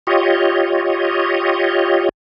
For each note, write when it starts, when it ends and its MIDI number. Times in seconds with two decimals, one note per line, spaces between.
0.07 2.09 65
0.07 2.09 67
0.07 2.09 73
0.07 2.09 75